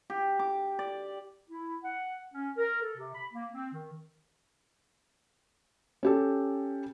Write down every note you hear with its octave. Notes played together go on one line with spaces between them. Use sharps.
G4
D6
D5
E4
F#5
C#4
A#4
A4
C3
B5
A#3
C4
D#3
C#4 G4 A4